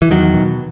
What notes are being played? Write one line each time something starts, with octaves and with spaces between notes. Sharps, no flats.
E3
E2 D#3 F#3
B2